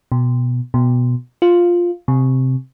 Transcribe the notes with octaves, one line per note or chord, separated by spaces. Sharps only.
B2
B2
F4
C3